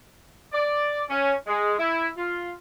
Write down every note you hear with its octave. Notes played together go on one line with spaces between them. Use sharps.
D5
C#4
G#3
E4
F4